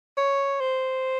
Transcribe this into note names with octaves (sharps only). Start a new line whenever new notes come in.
C#5
C5